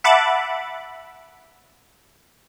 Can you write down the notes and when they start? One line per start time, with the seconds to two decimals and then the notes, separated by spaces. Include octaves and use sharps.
0.04 E5 F#5 A5 B5 D6